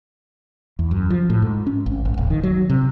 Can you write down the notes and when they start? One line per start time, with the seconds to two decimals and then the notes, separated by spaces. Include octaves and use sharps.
0.79 E2
0.91 F#2
1.10 F3
1.30 A2
1.42 G#2
1.67 C#4
1.86 G#1
2.05 G#1
2.18 D#1
2.30 D#3
2.43 F#3
2.70 C3